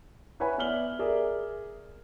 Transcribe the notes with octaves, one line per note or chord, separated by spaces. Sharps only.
E4 B4 C#5 F#5 G#5 B5
B3 D5 E5 F6 F#7 G7
G#4 A#4 D5 E5